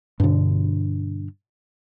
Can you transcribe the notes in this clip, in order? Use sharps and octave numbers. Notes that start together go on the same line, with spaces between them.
G2 B2 D3